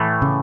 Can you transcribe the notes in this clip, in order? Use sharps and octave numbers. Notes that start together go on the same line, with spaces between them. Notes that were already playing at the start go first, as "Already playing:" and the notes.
Already playing: A2 E3 A3
C#3